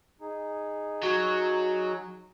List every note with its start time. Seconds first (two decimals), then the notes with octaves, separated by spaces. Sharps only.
0.21 D#4 G#4
1.03 F#3